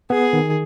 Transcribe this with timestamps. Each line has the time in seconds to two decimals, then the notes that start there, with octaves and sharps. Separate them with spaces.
0.10 B3 G#4
0.33 D#3